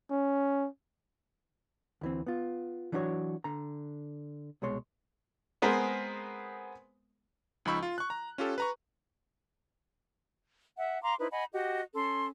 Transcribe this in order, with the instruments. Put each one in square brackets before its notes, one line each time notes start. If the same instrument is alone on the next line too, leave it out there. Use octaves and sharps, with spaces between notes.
[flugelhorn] C#4
[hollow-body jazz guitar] D2 E3 C4
B3 F4
E3 F#3 D4 E4 F#4 C#5
D3 A#5
C2 B2 G#3 C#5 C6
[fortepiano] G#3 B3 C4 G#4 A#4 C5
[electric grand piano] C#2 F3 D#4 B5 C#6 E6
F4
C#6 F#6
A#5
C#4 F4 G4 A4
B4 A#5 C#6
[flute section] E5 F#5
F5 A#5 C6 D6
D#4 E4 B4 C5
D#5 F#5 G#5 B5
F#4 G4 D#5 F#5
C#4 A4 C6